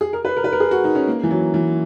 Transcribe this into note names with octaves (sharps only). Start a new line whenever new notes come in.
G#4
A#4
B4
A#4
B4
A#4
G#4
F#4
D#4
C#4
A#3
E3
F#3
E3